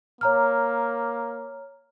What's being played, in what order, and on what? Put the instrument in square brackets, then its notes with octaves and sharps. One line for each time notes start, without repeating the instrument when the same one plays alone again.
[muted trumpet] A#3 [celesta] C#5 A#5 F6